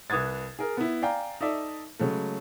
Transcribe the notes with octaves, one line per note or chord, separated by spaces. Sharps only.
C2 B4 D#6 G#6 A6
G#4 A#4
B3 E4
D5 F5 G5 G#5 A#5
D#4 A4 D5 E5
C#3 F#3 G#3 A3